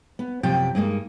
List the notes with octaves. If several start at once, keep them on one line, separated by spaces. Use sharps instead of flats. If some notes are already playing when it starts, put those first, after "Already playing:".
B3
F#2 C3 F3 G5 A5
G2 G#3 A#3 D#4